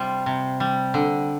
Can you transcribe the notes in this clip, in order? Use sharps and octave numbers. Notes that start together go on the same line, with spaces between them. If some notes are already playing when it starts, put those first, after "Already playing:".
Already playing: C3 G3 F4
C3
G3
D3